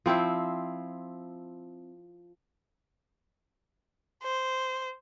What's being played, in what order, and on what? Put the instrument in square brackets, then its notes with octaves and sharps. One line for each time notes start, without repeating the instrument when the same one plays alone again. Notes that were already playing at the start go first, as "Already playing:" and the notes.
[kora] F3 C4 E4 C5
[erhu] C5